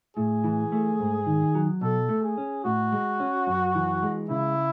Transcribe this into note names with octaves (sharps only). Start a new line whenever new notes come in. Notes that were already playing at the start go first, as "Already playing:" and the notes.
A2 G#4
E3
A3
G#2
D#3
F#3
B2 A4
A3
G#4
C#4
A2 F#4
G#3
C#4
F#2
E3
G#3
C#3 E4